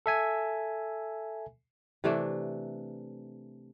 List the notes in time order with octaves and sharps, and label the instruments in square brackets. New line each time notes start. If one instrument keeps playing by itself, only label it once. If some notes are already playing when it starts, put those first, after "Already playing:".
[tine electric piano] A4 E5 G#5
[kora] C3 E3 A3 D4